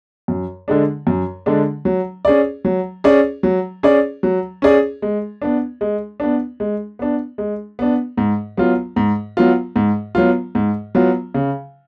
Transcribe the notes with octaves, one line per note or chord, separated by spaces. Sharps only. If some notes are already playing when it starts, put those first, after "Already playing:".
F#2
D3 G#3 D4
F#2
D3 G#3 D4
F#3
C#4 G#4 D5
F#3
C#4 G#4 D5
F#3
C#4 G#4 D5
F#3
C#4 G#4 D5
G#3
B3 D4
G#3
B3 D4
G#3
B3 D4
G#3
B3 D4
G#2
F#3 B3 F4
G#2
F#3 B3 F4
G#2
F#3 B3 F4
G#2
F#3 B3 F4
C#3